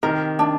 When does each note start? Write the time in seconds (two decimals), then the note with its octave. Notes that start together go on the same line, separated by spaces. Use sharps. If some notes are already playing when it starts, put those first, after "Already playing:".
0.03 C3 D#3 A#4
0.39 D4